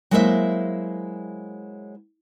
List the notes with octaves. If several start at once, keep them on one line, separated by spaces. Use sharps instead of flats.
F#3 G#3 A#3 E4 C5 E5